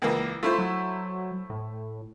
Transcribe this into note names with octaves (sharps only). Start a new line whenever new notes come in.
C#2 E3 A#3
A3 E4 F4 C5
F#3
A2